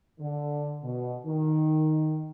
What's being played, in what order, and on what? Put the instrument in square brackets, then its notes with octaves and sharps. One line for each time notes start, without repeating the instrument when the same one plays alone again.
[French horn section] D3
B2
D#3